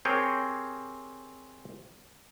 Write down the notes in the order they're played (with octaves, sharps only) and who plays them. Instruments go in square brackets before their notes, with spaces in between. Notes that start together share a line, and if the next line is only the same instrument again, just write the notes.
[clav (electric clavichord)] C4 G4 G#4 A#4 C#5 G5